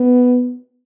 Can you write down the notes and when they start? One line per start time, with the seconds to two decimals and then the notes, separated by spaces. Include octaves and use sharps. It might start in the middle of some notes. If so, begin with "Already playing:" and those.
Already playing: B3